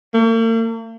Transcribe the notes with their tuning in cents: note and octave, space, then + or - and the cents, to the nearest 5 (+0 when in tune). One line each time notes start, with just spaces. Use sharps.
A#3 -45